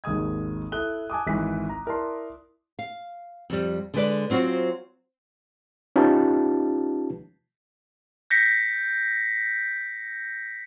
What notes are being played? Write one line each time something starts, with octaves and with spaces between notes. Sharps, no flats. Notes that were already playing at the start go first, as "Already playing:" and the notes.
G#1 D#2 G#4 D#6 G#6
E4 A4 D#6 F#6 G7
G#5 A5 D6 D#6
G#1 E3 B6
A#5
E4 A#4 D5 A5 C6
F5
F2 G3
D3 G#3 B4 D5
F#3 C4 F4 F#4 C5
C#4 D#4 F4 G4 B4 A5
G6 A#6 B6 C#7